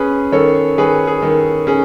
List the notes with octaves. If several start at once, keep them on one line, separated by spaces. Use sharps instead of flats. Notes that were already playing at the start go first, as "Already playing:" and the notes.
Already playing: C#4 G#4 B4
D#3 A4 C#5
D#3 G#4 B4
G#4
D#3
C#4 G#4